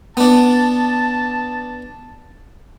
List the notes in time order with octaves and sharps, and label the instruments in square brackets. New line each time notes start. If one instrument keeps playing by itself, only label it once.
[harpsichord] B3 D4 [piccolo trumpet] A5